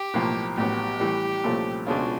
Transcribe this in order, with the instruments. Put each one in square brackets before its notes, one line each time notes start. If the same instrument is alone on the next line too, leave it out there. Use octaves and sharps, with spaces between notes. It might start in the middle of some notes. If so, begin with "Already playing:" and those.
Already playing: [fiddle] G4
[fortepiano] B1 A2 F3 A#3
[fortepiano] A1 A2 F#3 B3 [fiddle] G4
[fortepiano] A2 E3 G3
C2 A#2 F3 A3 C#4
[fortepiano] C#2 B2 G#3 C#4 F4 [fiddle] D4